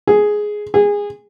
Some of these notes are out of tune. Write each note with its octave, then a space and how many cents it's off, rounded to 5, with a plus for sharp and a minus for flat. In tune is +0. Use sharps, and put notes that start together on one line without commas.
G#4 +5
G#4 -20